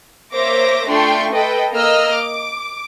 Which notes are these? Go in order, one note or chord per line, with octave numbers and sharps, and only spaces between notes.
A#3 C5 C#5 E5 D6 A#6
A3 D4 F4 G5 C6 C#6
A4 B4 D#5 G5
A#3 D#5 A#5 E6 F6
D6